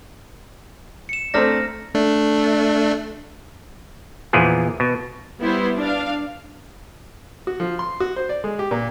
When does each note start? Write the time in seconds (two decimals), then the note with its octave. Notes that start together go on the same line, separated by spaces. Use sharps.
1.09 C#7 E7
1.34 A3 C4 D4 A#5 F6 A#6
1.95 A3 D4
4.33 E2 A#2 E3 F3 B3 G#4
4.80 B2
5.39 G3 B3 E4 C5
5.77 D4 F5
7.47 F#4
7.60 F3
7.79 C6
8.00 F#4
8.16 C5
8.29 D5
8.44 G#3
8.59 G4
8.71 A#2